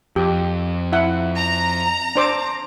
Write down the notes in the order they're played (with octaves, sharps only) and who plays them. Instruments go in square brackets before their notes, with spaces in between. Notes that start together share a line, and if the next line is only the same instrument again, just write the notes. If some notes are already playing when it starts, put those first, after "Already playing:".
[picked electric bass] F2 [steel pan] G4
[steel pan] E4 E5 F#5
[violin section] A#5
[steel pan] D4 C5 D6